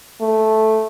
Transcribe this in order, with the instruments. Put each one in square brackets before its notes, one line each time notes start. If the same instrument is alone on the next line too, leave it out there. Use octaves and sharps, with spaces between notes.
[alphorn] A3